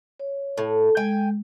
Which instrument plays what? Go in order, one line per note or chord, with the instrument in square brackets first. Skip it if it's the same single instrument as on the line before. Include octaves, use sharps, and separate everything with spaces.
[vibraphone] C#5
[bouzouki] A2
[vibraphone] G#3 [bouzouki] G5 G#5